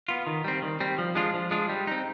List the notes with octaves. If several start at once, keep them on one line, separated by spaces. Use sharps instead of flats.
B3 F4
D#3
G3 C4
D#3
G3 C4
F3
G#3 D4 F4
F3
G#3 D4 F4
G3
C4 D#4